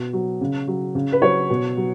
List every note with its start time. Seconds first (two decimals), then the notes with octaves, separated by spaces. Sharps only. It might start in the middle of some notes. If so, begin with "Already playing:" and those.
Already playing: B2
0.13 F#3
0.41 C#3
0.68 F#3
0.95 C#3
1.12 B4
1.22 F#3 C#5
1.50 B2
1.77 F#3